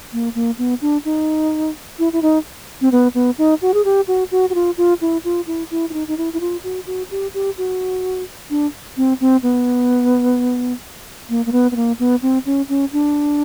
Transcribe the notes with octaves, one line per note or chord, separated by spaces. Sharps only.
A#3
A#3
B3
D4
D#4
E4
E4
D#4
C4
B3
B3
D#4
F#4
G#4
G4
F#4
F#4
F#4
F4
F4
E4
F4
E4
E4
E4
D#4
D#4
E4
E4
F4
F#4
F#4
G4
G4
F#4
D4
C4
C4
B3
A#3
A#3
B3
B3
A#3
B3
C4
C#4
C#4
D4